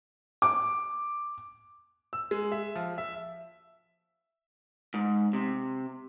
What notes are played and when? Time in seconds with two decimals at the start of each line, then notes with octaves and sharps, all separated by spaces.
0.42 D6
2.13 E6
2.31 G#3
2.52 E5
2.75 F3
2.98 E5
4.94 G#2
5.33 C3